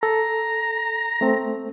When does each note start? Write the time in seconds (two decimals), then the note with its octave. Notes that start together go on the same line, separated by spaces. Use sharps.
0.03 A4 A#5
1.21 A3 C4